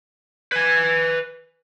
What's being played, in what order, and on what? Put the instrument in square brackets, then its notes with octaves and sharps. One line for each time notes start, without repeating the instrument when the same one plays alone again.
[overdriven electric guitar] B4 G#5